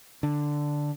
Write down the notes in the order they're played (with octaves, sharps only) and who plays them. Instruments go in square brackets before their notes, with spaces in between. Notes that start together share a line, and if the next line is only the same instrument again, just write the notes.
[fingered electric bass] D3